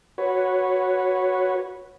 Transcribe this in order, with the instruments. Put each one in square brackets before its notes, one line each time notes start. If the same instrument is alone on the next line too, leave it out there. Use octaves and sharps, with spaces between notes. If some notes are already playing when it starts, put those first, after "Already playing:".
[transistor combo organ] F#4 B4 C#5